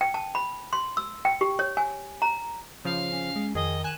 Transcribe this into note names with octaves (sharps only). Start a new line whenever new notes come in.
G5
A5
B5
C6
E6
G5
G4
C#5
G#5
A#5
C#3 F3 F5
C#4
G#3
F2 D#3 G#4 D#5
G#5 F#6 E7